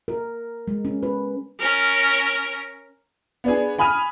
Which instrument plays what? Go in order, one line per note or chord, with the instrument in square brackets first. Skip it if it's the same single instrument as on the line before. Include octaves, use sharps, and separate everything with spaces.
[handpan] A#4
G#3
C#4
B4
[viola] C#4 A#4
[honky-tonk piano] B3 D4 G#4
G#5 B5 D#6 F6 D#7